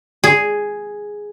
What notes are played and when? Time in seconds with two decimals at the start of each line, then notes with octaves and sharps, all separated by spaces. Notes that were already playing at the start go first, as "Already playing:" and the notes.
0.24 G#4